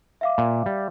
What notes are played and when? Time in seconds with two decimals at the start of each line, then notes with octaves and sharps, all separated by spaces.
0.21 E5 F5 D6
0.38 A#2
0.66 G3